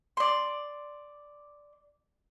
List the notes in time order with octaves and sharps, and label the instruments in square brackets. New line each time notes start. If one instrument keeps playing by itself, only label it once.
[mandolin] D5 C6